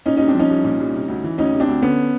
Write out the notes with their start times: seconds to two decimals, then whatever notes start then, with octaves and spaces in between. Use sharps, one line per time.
0.06 A#2 C#4 D#4
0.17 C2 C#4 D#4
0.28 C4 D4
0.35 F3 C#4 D#4
0.50 C2
0.64 A#2
0.80 C2
0.94 C3
1.08 D2
1.24 E3
1.38 D2 C#4 D#4
1.53 C3
1.60 C4 D4
1.68 D2
1.82 D3 B3 C#4